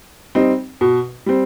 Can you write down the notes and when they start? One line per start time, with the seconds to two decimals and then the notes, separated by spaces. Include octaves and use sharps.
0.35 G3 C4 D#4
0.81 B2
1.26 G3 C4